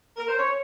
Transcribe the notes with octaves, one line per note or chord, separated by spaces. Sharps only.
A#4
C5
C#5